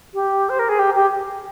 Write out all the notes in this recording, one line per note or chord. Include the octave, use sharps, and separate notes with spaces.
G4
C5
A#4
G#4
G4
G4